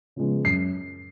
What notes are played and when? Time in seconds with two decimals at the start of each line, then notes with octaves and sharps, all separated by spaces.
0.16 C#3 F3 G#3 B3
0.45 F#2 C7